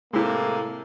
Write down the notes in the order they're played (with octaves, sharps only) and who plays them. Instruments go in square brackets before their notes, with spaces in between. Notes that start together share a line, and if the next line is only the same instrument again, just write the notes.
[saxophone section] A2 C3 [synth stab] G#3 E4 [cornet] A#3